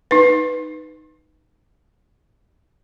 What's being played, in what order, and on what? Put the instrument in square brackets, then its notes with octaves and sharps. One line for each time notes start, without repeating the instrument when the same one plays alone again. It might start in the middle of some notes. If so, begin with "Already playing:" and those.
[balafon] D#4 B4